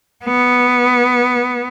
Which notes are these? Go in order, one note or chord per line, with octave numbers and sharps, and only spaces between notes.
B3